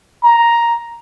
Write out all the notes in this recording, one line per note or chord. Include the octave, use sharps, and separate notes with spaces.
A#5